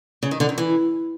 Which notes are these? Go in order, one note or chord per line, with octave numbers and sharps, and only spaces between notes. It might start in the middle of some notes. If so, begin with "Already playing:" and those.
C#3
D#3
D3
D#3
E3